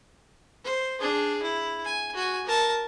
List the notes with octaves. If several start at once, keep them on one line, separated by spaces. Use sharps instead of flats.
C5
D4 G#4
E4
G#5
F#4 G#5
A#4 A5